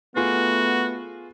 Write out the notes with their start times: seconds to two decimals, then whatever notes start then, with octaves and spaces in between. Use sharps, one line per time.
0.16 A3 B3 F4 F#4 G#4 B4